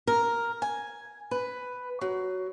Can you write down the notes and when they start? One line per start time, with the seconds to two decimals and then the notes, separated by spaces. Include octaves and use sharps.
0.07 A#4
0.62 G#5
1.31 B4
2.01 F#3